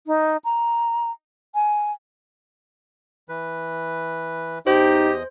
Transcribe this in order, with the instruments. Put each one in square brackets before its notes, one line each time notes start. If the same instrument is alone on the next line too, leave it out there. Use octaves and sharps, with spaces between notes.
[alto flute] D#4
A#5
G#5
[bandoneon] E3 B4
[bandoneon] E2 D#5 [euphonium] D#4 [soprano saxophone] G4 [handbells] C5